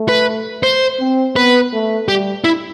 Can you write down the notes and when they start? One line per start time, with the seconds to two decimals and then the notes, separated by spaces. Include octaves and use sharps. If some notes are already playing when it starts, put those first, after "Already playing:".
Already playing: A3
0.09 B4
0.63 C5
1.00 C4
1.36 B3 B4
1.73 A3
2.08 G3 G4
2.44 E4